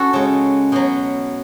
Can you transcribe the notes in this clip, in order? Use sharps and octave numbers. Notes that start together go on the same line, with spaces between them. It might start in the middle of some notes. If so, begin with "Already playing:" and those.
Already playing: C#4 F#4 A4
C#3 G#3
B2 F#3